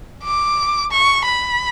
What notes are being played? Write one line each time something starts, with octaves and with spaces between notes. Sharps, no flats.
D6
C#6
B5